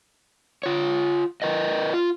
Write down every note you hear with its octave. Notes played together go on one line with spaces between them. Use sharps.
F4 C#5
A#4 B4 D#5
F4